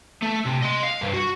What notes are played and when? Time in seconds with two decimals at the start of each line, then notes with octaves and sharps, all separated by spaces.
0.23 A3
0.46 C3
0.63 D#5 C6
0.83 F5
1.01 C2 G2
1.14 F#4